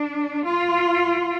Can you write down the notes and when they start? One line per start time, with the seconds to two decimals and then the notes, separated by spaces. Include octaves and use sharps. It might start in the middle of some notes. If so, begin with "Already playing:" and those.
Already playing: D4
0.43 F4